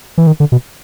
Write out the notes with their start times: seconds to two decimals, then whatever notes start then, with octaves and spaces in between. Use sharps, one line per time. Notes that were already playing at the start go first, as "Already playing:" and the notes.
0.18 E3
0.27 D#3
0.40 D3
0.52 B2